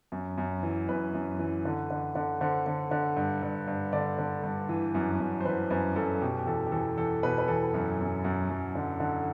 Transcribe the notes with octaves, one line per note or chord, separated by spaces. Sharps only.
F#2
F#2
E3
F#2 B4
F#2
E3
D3
D3
D3
D3 C5
D3
D3
G2
G2
G2
D3 D5
D3
G2
E3
F#2
F#2
C5
E3 B4
F#2 B4
F#2 A4
B2 G4
G4
E2 A4
G4
E2 A4
E2 A4
B2 B4
B4
E2 A4
F#2
F#2
F#2
F#2
D3
D3